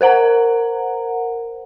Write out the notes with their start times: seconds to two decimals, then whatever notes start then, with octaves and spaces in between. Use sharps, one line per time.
0.01 A#4 C5 F#5 A#5